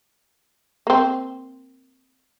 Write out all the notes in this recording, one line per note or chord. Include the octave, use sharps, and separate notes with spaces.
A#3 C4